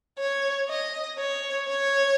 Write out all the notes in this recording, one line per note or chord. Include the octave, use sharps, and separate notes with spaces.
C#5
D#5
C#5
C#5